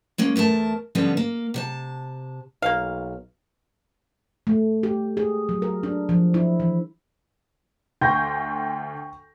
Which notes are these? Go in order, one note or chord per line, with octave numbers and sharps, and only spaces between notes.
G#3 A#3 C#4
E2 A3 A#4 A5
D3 F3 G3 B3 C#4
A#3
C3 C#5 A5
B1 A#3 F5
A3
G4
G#4
F#3
A#4
D4
F3
E4
E3
D2 G5 C6 C#6 G6 A#6